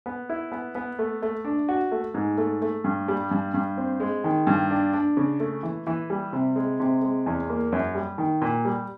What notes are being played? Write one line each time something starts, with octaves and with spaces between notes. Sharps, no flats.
B3
E4
B3
B3
A3
A3
D4
F#4
A3
G#2
A3
A3
G2
G3
G2
G2
C4
G#3
D#3
G2
D4
D4
C#3
A3
E3
E3
G3
C3
G#3
C3
G#3
E2
A#3
F#2
G3
D#3
A#2
G3